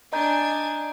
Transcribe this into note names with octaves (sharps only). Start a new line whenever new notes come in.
D4 D#5 G#5 A#5 G6